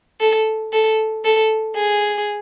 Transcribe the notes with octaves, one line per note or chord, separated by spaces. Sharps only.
A4
A4
A4
G#4